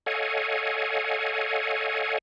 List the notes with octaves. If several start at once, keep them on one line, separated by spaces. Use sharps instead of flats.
A4 C#5 D#5 F5 F#5 G#5